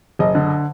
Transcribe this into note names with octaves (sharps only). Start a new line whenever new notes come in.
F#1 D#5
D3